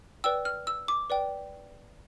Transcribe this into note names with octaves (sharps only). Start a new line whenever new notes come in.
B4 D5 G5 E6
F6
E6
D6
B4 D5 G5